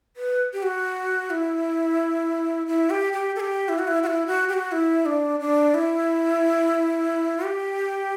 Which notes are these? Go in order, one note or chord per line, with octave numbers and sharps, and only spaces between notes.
B4
G4
F#4
E4
E4
G4
G4
A4
G4
E4
F#4
E4
F#4
E4
F#4
G4
F#4
E4
D4
D4
E4
G4